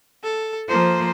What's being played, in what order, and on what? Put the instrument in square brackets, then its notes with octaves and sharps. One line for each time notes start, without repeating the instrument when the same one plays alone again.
[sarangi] A4
[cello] F3 A#3 [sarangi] C5